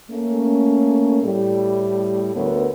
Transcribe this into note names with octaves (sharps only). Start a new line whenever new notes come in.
A3 A#3 C#4
A2 G3
D2 A3 B3 A#4 B4 C#5